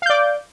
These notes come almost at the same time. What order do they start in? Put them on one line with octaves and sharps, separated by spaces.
F5 G6 D5 D6